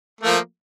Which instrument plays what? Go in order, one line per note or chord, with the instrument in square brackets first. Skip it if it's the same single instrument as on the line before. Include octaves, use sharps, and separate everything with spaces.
[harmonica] A3
A#3
F3